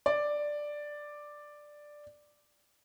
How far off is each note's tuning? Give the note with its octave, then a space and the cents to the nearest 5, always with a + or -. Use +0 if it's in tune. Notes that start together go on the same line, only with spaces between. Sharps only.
D5 +5